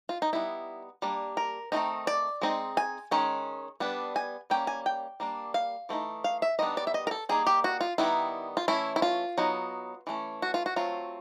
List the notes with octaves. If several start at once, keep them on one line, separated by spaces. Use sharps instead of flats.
F4
D#4
G3 B3 D#4 E4
G3 A#3 D4
A#4
D#3 F#3 A3 C4 D#4
D5
G#3 C4 D#4
G#5
D#3 G#3 C#4
G3 B3 D4
G#5
G3 A#3 C#4 G5
G#5
G5
G3 A#3 D4
F5
E3 A3 C4 D#4
F5
E5
D#3 G3 B3 D4 D#5
D5
E5
D#5
A#4
A4
G3 A#3 D#4 G#4
G4
F#4
F4
D#3 G3 B3 D#4 E4
F4
E3 A3 C#4 E4
E4
F4
F#3 B3 D#4
E3 A3 C#4
F#4
F4
F#4
F#3 A3 C4 F4